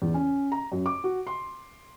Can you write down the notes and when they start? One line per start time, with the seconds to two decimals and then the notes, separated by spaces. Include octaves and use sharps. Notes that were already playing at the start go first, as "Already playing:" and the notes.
0.02 E2
0.14 C#4
0.52 A#5
0.72 F#2
0.86 D6
1.04 F#4
1.27 C6